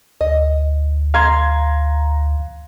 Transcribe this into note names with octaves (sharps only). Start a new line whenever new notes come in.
D2 D#5
F5 A#5 C6 G#6